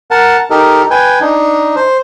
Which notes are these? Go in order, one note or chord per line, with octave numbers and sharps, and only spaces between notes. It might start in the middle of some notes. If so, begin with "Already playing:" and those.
A#4 F#5 A5
D#4 G4 A4 A#4
B4 G5 G#5
D4 D#4
C5